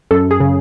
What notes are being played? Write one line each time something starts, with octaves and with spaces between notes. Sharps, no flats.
F#2 A4
G#4
C#3